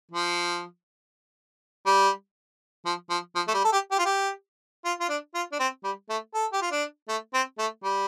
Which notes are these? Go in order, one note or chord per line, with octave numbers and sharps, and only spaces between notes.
F3
G3
F3
F3
F3
A3
G3
A4
G4
G4
F4
G4
F4
F4
D4
F4
D4
C4
G3
A3
A4
G4
F4
D4
A3
C4
A3
G3